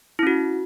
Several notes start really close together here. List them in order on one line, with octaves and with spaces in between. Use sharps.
E4 C#4 F#4